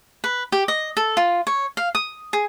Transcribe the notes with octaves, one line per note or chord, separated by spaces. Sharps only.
B4
G4
D#5
A4
F4
C#5
F5
D#6
G#4